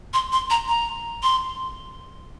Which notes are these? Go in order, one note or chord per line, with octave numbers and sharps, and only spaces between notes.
C6
C6
A#5
A#5
C6